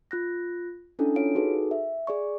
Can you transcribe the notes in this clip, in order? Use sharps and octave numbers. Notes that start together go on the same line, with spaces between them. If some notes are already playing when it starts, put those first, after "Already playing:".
F4 F#6 A#6
C#4 D4 E4 A4
F4 C#5 F5 D7
D#4 F#4 G#4 A4 B4
E5
G#4 D5 C#6